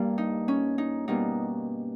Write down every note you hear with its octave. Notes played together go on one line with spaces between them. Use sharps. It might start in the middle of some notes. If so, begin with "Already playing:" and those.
Already playing: G2 G3 A#3
D#4
C#4
D#4
B2 G3 A#3 D#4